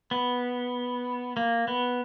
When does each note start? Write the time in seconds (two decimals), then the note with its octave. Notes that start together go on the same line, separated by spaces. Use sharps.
0.11 B3
1.37 A#3
1.68 B3